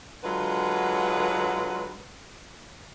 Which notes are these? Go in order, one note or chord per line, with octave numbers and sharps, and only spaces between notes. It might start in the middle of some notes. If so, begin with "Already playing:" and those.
D3 F#3 G#3 F4 B4